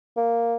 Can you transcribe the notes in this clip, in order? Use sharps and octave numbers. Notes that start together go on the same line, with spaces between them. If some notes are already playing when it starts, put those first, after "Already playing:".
A#3